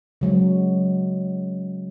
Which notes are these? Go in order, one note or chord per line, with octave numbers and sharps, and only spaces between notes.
C#3 F#3 G#3